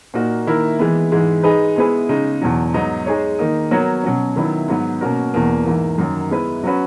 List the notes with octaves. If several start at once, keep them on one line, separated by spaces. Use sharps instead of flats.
A#2 A#3 D#4 F#4
D#3 A#3 E4 A#4
E3 G#3 B3
G#2 E3 G#3
G#3 D#4 G#4 B4
G#3 B3 E4 G#4 B4
C#3 G#3 D#4
E2 B2 F#3
G#2 F#3 B3 D#4
G#3 D#4 G#4 C#5
D#3 A#3 D#4
F#3 B3 F#4 A#4 C#5
B2 F#3 C#4
D#3 F#3 B3 E4
G#2 F#3 B3
B2 A#3 C#4 F#4 A#4
E2 B2 A#3
G#2 E3 A#3
F#2 D#3 F#3
G#3 B3 E4 B4
F#3 C#4 F#4 B4